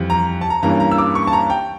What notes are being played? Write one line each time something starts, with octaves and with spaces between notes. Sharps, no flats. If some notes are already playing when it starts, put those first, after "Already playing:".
Already playing: F2 E3 G3
A#5
A5
A#5
G2 E3 G3 A#3 C#4 A#5
A#5
E6
D6
C#6
A5
A#5
G5